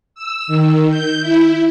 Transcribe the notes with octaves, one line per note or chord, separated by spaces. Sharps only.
E6
D#3
G6
E4